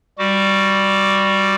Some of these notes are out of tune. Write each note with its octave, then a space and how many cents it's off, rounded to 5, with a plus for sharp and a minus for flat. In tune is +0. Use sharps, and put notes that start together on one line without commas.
G3 +0 F#4 +0 D6 +0